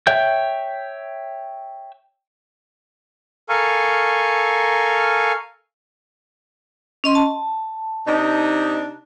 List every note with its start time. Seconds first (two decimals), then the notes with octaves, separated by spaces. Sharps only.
0.07 C#5 E5 G5 G6
3.49 A4 A#4 F5 G#5 C#6
7.04 C#4 D#5 C6
7.15 A5
8.07 C3 D4 D#4